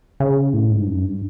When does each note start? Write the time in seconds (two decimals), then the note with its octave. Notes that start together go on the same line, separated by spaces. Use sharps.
0.20 C#3
0.53 A2
0.71 G#2
0.81 G2
0.88 F#2
1.04 G2